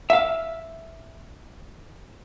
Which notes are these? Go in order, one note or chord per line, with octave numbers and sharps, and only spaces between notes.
E5 F5